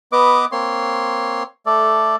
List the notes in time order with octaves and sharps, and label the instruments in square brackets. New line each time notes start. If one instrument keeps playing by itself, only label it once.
[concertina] B3 B4 D#5 D6
A#3 C4 C#5 C6
A3 A4 D5